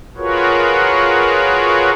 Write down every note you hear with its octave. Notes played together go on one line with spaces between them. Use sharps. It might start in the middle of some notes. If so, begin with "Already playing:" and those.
F4 F#4 G#4 A#4 B4 C#5